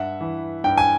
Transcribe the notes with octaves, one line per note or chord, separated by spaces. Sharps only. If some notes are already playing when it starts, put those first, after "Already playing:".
Already playing: G2 E5 F#5
E3
G2 G5
G#5